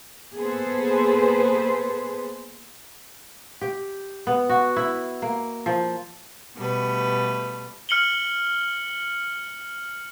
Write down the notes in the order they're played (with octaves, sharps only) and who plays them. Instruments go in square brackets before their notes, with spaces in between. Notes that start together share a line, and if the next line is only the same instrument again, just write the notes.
[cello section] A#3 B3 G#4 A4 B4 C5
[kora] G4
B3
F#4
E4
A#3
F3
[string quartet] B2 G3 A3 B4
[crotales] F6 C#7 F#7 G7